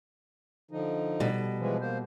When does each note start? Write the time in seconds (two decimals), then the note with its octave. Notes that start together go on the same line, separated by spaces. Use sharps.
0.71 D3 F3 D#4
1.20 B2 G3
1.59 E3 F3 G#3
1.81 A#3 C5